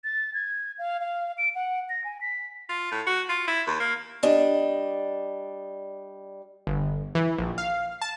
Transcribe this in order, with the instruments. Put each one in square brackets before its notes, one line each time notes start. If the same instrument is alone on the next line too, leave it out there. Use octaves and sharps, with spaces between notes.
[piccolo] A6
G#6
F5
F5
D7
F#5
A#6
G#5
B6
[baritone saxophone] F4
A2
F#4
F4
E4
D#2
A#3
[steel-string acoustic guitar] G3 D4 D#5
[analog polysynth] G1
E3
A#1
F5
A5